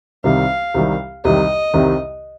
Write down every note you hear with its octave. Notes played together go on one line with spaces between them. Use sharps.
C2 C3 D#3 G3 F5
C2 C3 D#3 G3
C2 C3 D#3 G3 D#5
C2 C3 D#3 G3